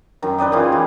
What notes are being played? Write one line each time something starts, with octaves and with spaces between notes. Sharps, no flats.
F#2 D#3
B4 D5 D#5 G5
C#3 E3 F4
G4 B5